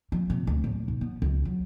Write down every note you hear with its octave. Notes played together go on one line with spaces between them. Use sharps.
F3
C3
D2
D1
B1
B3
C#2
F#3